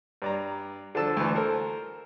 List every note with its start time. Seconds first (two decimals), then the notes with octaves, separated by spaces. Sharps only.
0.22 G2 D5 A#5
0.95 D3 F3 A5 E6
1.17 D2 E3
1.35 A4 A#4 C5